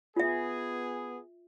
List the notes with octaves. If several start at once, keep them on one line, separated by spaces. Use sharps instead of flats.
B3 F4 G#4 E5